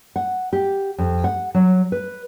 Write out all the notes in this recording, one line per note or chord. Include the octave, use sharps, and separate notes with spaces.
F#5
G4
F2
F#5
F#3
B4